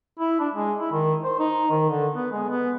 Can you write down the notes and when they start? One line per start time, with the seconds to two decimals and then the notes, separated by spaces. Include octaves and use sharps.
0.19 E4
0.40 D4
0.54 G#3
0.80 E4
0.92 D#3
1.24 C5
1.39 D#4
1.71 D#3
1.89 D3
2.14 B3
2.31 G#3
2.49 B3